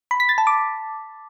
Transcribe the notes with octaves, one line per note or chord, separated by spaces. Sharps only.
B5
B6
A6
A5
D6